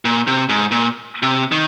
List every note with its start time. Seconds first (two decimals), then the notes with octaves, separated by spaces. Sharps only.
0.05 A#2
0.27 C3
0.49 G#2
0.71 A#2
1.23 C3
1.52 D#3